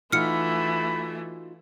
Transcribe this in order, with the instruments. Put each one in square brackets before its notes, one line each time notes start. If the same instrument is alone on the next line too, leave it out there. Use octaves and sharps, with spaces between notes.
[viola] E3 A3 [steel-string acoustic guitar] D#4 F4 F#4 [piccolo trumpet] B5 [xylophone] F6 C#7